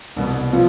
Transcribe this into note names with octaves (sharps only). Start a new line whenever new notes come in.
C2 B2 B3
F3 B3 F4